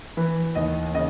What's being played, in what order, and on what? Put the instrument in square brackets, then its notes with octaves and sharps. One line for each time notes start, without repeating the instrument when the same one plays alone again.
[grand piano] E3 B4
D#2 D#5
C#3 D#5